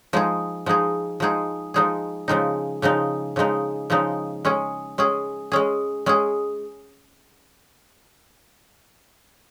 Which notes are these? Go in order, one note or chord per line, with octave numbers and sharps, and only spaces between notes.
F3 G#3 D#4 G#4
F3 G#3 D#4 G#4
F3 G#3 D#4 G#4
F3 G#3 D#4 G#4
C#3 F3 G#3 D#4
C#3 F3 G#3 D#4
C#3 F3 G#3 D#4
C#3 F3 G#3 D#4
G#3 C#4 G#4
G#3 C#4 G#4
G#3 C#4 G#4
G#3 C#4 G#4